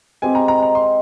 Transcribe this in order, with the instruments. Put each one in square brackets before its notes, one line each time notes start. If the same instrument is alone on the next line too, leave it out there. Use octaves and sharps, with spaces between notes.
[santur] G#3 C4 G4 [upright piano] G#5
[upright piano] A#5
A#5
A#5
C6